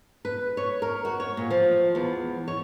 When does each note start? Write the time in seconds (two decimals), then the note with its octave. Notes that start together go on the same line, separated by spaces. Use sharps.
0.25 B4
0.57 C#5
0.82 A#4
1.05 F#4
1.20 C#5
1.37 A#2
1.50 F3
1.95 E2
2.48 C#5